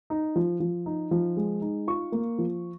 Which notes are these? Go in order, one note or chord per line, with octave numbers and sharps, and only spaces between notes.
D#4
F3
F3
D#4
F3
G#3
D#4
F4 C#6
A#3
F3